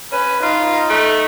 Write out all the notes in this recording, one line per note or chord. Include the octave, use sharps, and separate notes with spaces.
C#4 B4
D#4 F4
A3